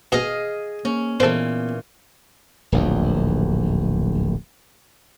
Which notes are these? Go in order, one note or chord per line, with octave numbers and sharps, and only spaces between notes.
B2 G#4 D#5 F5
A#3 C#4
A#2 E3 B3 A4 C5
D1 A#1 D#2